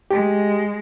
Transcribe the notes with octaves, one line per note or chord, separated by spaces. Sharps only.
G#3 G4